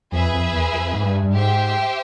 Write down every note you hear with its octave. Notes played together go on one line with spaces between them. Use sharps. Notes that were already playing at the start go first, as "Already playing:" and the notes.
F2 G#4 B4 E5 G#5
F2
E2
F2
G#2
G2
G2
G#2 G4 C5 E5 G5